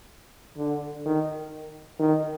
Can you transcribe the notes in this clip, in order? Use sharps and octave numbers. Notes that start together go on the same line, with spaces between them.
D3
D#3
D#3